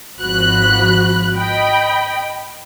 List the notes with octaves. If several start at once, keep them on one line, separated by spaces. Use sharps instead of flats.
G#1 F3 F#4 B5 F#6
D#5 G5 B5